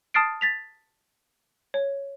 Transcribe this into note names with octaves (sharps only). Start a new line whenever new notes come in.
A5 D#6 F6 A6 C7 D7
A6 B6 F7
C#5